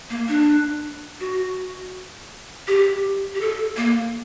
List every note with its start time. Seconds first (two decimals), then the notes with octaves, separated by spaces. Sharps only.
0.10 A#3
0.28 D4
1.20 F#4
2.68 G4
3.35 G4
3.41 A4
3.77 A#3